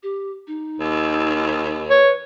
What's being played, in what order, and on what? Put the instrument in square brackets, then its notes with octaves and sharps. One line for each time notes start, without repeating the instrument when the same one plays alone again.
[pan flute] G4
D#4
[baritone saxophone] D#2
[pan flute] B4 [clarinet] C#5